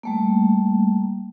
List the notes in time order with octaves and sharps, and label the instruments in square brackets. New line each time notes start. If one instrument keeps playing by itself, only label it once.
[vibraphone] G3 A3 A#3